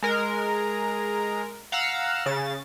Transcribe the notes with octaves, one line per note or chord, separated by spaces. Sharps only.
G#3 A#4
F5 F#5 A#5 E6
C#3 A6